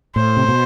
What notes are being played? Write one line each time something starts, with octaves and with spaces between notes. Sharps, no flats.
A2 C5
C3
B2